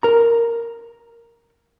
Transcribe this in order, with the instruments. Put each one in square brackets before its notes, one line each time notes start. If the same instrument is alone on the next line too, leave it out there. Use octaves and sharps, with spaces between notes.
[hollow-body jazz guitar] A#4 A#5